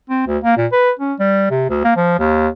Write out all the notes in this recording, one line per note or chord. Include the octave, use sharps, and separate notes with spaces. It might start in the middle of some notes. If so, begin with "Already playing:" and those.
C4
D2
A#3
A#2
B4
C#4
G3
C3
D2
A#3
F3
D#2